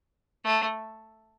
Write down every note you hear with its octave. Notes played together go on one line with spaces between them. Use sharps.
A3